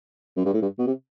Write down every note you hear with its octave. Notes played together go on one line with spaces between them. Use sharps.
F#2
G2
A2
G2
B2
C3